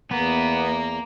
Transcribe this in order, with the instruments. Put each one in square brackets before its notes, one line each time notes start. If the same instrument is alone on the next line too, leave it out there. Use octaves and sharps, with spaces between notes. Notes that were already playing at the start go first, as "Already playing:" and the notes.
[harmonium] E2 [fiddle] A#3 [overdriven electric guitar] B3